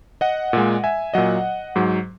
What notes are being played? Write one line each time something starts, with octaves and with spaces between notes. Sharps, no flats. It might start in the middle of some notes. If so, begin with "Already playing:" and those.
D#5 F#5
A#2 G#3
E5 G#5
A#2 F#3 D#5 F#5
G#2 F#3